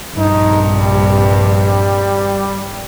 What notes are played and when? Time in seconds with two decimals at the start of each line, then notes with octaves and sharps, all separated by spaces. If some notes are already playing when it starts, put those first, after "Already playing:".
0.18 A#1 G2 C3 D#4
0.74 G3